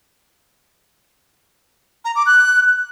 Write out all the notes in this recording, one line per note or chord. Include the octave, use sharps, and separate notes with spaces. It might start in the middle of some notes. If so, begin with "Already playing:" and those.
A#5
D6
F#6